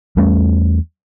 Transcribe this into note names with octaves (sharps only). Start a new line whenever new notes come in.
E2 G3 A3 C#4